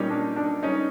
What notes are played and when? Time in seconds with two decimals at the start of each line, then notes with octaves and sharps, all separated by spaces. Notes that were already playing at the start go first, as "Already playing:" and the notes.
Already playing: A#2 G3 C#4 D#4
0.10 D4
0.36 D4
0.63 C#4 D#4